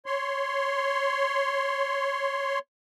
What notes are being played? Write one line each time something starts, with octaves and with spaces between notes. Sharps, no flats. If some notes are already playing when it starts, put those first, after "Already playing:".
C#5 C6